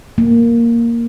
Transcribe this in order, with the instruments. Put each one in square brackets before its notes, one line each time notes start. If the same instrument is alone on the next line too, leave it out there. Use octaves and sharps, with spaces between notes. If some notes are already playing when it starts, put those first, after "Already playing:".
[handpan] A#3